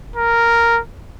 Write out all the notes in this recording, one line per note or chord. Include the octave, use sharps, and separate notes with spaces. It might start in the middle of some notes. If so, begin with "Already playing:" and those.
A#4